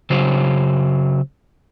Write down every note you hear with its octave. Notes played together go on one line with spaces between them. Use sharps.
C#3 F#3 C5